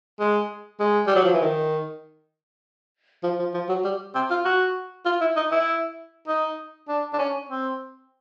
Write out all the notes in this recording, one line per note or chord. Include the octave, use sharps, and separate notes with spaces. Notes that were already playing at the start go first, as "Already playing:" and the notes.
G#3
G#3
G3
F#3
F3
E3
D#3
F3
F3
F3
F#3
G3
C4
F4
F#4
F4
E4
D#4
E4
D#4
D4
D4
C#4
C4